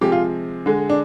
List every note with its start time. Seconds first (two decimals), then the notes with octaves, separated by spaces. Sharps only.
0.01 C3 F3 G#3 G4
0.12 F4
0.66 D3 G#3
0.90 D4